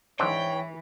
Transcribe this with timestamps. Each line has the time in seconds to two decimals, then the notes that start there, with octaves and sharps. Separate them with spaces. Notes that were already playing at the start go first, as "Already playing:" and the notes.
0.20 G#2 E3 C4 D4 C#5 G5